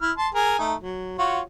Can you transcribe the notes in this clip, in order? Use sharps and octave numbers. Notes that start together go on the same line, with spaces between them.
E4 F6
A5 C6
G#4 A#4 G#5
A3 D#4
F#3
F4 F#4 C#5